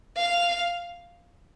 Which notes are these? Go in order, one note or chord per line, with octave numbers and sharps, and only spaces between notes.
F5